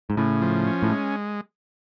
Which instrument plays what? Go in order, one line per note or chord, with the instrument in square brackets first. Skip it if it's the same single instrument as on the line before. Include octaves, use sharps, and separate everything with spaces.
[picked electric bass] G#2
[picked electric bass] A2 [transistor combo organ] C#3
[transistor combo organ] F3
C#4
[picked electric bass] A2
[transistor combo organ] G#3